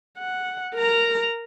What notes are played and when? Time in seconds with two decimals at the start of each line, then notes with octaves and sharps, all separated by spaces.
0.18 F#5
0.75 A#4 A#5